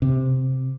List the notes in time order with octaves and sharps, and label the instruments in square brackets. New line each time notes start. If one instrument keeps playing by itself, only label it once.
[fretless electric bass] C3